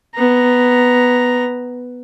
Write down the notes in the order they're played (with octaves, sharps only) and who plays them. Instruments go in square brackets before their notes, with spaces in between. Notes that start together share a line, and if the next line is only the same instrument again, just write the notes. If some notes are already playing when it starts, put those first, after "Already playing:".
[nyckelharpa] B3 A#5